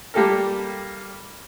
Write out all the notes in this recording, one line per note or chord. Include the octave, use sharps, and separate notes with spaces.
G3 A#3 G4 A4 A#4